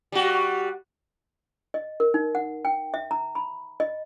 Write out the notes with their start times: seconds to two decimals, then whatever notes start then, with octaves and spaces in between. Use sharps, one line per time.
0.12 G3 F#4
1.74 D#5
2.00 A#4
2.14 D#4
2.35 F#5
2.65 G5
2.94 E5
3.11 A#5
3.35 B5
3.80 D#5